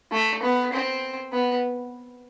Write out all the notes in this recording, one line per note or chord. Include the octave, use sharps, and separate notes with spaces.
A3
B3
C4
B3